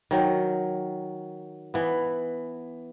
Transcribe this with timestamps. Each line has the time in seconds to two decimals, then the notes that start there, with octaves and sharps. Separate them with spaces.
0.11 D#3 F#3
1.74 E3 B3